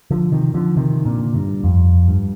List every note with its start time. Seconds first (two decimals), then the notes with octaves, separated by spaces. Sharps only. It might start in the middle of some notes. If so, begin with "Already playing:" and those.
0.11 D3 F3
0.32 C3 D#3
0.54 D3 F3
0.76 C3 D#3
1.05 A#2 D3
1.35 G2
1.64 F2
2.08 G2